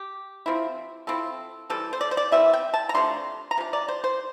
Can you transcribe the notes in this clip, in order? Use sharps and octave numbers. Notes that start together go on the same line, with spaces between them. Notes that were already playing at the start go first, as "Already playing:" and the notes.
Already playing: G4
F3 C4 E4
F3 C4 E4 A4
E3 G3 C4 A4
C5
D5
C5
D5
E3 G3 C4 E5
G5
A5
A#5
C3 F3 A3 D4 C6
A#5
C3 F3 D4
D5
C5
C5